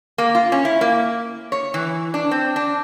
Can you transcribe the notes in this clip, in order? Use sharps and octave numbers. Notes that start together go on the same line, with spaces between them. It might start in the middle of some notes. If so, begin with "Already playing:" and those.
A#3
F4
C#4
E4
A#3
C#5
E3
D4
C4
D4